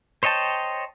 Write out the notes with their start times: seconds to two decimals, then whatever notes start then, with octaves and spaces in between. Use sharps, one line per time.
0.23 C5 C#5 D#5 G5 A5